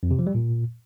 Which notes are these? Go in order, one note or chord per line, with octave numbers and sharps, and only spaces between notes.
F2
C3
F3
G3
A#2